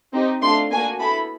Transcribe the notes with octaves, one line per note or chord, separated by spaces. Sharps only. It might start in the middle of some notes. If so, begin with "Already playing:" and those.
C4 D#4 G4
A3 D4 F4 C6
A#3 D4 F#4 G#5
B3 E4 A4 B5